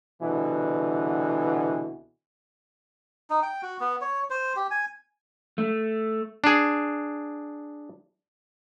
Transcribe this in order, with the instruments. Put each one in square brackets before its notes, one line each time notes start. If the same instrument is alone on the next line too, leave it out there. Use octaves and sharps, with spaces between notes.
[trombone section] C2 B2 D3 E3
[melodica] D#4
G5
F#4
B3
C#5
C5
G4
G#5
[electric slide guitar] A3
[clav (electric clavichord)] D4 G#4